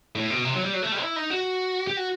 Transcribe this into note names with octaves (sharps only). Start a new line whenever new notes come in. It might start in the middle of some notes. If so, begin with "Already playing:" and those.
A2
B2
C3
F#3
G3
F#3
A3
G3
E4
D#4
F#4
G4
F#4